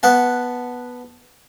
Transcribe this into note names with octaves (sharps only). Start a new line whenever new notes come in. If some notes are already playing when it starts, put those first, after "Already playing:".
B3 F#5 A5